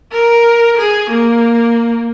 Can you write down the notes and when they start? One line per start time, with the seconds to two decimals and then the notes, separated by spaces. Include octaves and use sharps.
0.12 A#4
0.78 G#4
1.10 A#3